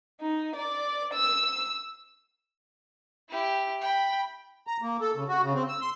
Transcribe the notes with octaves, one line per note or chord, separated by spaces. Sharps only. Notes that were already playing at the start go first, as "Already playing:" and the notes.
D#4
D5
E6
E4 G4
G5 B5
A#5
A#3
A4
C#3
F#4
C#3
C4
E6
C6